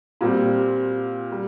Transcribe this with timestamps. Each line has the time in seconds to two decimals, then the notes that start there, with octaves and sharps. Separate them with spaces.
0.21 A#2 G3 C4
1.32 G3